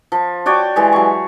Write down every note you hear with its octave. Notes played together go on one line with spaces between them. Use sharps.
F3
F#4 C#5 D5 G5
E3 G#3 G4
F#3 C#6